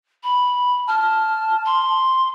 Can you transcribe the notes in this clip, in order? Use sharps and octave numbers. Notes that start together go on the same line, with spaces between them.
B5
A5 F6
C6